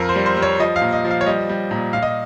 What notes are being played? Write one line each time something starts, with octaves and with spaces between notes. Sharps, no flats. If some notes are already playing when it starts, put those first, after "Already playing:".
Already playing: F2 A#4
C5
G3
C5
G3
C#5
F3 D#5
F5
A#2
D#5
F3
F5
C#5
G3 D#5
G3
A#2
A#2 F5
D#5